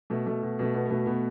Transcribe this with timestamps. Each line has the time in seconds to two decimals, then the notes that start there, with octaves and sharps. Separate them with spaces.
0.10 B2 A3
0.26 B2 A3
0.43 B2
0.59 B2 A3
0.74 B2 B3
0.85 B3
0.90 B2 A3
1.06 B2 B3